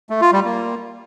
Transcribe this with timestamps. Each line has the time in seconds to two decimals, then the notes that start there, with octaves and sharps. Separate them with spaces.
0.10 A3
0.21 F4
0.33 G3
0.44 A#3